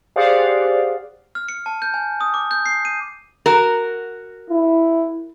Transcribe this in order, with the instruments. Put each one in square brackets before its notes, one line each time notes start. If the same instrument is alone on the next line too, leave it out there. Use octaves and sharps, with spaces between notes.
[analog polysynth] G4 G#4 C5 D5 F5 F#5
[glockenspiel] F6
C#7
A5
G6
G#5
D#6
D6
G6
C7
D#7
[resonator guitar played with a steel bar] F#4 A#4
[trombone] E4